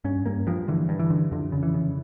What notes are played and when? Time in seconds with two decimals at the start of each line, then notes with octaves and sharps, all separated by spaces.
0.04 G2 C#4
0.26 G2 A#3
0.47 G2 F3
0.68 D3 E3
0.89 G2
0.99 E3
1.10 D3
1.31 F2 D3
1.52 C#3
1.63 E3
1.74 C#3